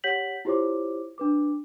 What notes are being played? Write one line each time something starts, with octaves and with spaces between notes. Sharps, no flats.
G4 C#5 F#5 G6 B6 F#7
E4 F4 G4 C5 C#5 D6
D4 B4 D6